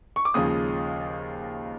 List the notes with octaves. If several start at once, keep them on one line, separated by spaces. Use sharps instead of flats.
C#6
D6
D#2 C#3 F3 G#3 D#6